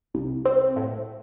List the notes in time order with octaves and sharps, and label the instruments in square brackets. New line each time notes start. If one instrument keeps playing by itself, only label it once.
[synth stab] C2
C4
A2